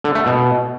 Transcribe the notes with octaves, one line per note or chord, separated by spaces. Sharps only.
D3
A3
B2